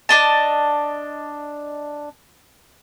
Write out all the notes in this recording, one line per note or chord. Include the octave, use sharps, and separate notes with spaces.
D4 D#5 A5